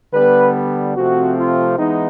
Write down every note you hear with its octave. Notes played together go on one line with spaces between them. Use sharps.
D3 G3 B3 B4
C3 F3 A3 C4 F#4
F4
E3 G#3 B3 D#4